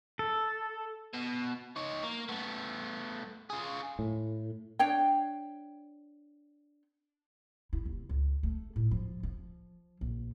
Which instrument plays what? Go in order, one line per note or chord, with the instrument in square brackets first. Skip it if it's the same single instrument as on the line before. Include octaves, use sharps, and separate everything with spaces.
[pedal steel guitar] A4
[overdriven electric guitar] B2
D#4 C#5
A#3
A3 B3
F4 G#4
[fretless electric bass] A2
[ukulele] D4 C#5 G5
[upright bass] E4
D#1
C#2
A3
A2
F3
F3
A#1